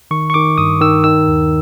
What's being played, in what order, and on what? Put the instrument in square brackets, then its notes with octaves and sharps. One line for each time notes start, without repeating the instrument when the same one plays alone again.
[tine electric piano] D#3 C#6
C#6
D#3 D6
G2 D#6
D#3 E6
D#3 E6
D#2